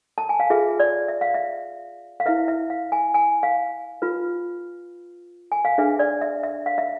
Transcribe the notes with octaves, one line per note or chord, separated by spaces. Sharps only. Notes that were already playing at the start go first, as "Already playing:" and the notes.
A5
G#5
F5
F4 G#4 B4 E5
D5
E5
F5
E5
F5
E4 B4 E5
E5
F5
G#5
G#5
F5
F4 B4
G#5
F5
D4 G#4 B4 E5
D5
E5
E5
F5
E5